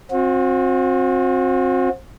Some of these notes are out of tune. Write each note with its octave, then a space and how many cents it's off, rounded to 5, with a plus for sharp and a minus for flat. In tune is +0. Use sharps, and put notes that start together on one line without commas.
C4 +20 F#4 -40